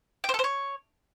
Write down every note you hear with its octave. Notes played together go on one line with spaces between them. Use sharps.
G5
C5
A4
C5
C#5